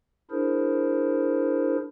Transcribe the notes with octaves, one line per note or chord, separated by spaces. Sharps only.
D4 E4 G#4 A#4 C5